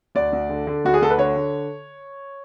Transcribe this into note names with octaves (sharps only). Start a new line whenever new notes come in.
D2 D5
D2
D3
D3
D2 F#4
G#4
D2 A4
B4
D3 C#5
D3